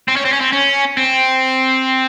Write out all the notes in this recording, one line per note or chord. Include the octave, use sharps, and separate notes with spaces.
C4
C#4
C4
C#4
C4
C#4
C4